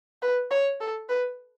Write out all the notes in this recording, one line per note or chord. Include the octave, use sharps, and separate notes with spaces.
B4
C#5
A4
B4